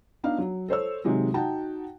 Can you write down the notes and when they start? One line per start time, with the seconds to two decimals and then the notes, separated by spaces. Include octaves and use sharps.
0.24 B3 D4 D#4 F5
0.38 F#3
0.68 A4 C5 C#5 E6
1.05 C3 D#3 F#3 G#3
1.34 D#4 F#4 F#5 G5 A5